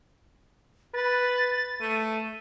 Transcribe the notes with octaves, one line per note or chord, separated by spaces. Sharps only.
B4 A6
A3 D#7